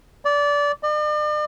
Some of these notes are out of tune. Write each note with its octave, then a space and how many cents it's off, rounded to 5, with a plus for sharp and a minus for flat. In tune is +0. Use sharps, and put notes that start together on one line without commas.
D5 -20
D5 +45